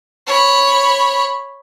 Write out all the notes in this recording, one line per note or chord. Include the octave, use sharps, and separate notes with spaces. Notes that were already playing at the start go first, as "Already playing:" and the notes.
C#5 B5